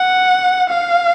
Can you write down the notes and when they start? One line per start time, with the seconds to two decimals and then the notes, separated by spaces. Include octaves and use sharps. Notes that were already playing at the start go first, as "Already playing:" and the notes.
Already playing: F#5
0.70 F5